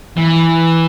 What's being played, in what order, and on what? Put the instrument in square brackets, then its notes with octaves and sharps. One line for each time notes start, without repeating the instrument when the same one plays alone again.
[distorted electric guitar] E3